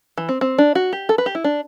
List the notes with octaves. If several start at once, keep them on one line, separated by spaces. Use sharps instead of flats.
E3
C4
C4
D4
F#4
G4
A4
B4
G4
E4
D4